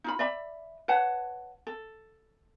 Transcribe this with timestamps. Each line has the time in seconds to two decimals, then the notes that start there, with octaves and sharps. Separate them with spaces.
0.04 D#4 F4 B5
0.19 D5 E5 B5
0.88 B4 C#5 F#5 A5
1.67 A4